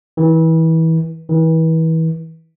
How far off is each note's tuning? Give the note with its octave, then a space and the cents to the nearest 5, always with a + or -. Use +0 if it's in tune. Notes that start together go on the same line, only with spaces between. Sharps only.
E3 -30
E3 -35